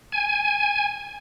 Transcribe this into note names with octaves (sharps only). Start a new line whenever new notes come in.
G#5